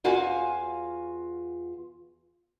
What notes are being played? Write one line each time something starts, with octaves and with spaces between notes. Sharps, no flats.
E2 F4 F#4 F5 G#5